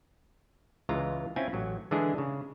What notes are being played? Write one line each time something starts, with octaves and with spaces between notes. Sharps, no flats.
C#2 E3 G#3 F4 A#5
C4 C#4 E4 F4 G#5
A1 F#3
D3 E3 G#3 D4 E4 G#4
C#3